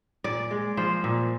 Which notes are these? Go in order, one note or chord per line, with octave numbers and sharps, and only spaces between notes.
A#2 D5
G#3
F3 C5
A#2